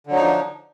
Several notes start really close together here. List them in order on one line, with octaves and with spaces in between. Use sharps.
D3 F#3 D#4 F3 D4